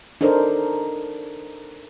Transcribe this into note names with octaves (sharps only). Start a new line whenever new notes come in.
D4 D#4 A4 A#4 C5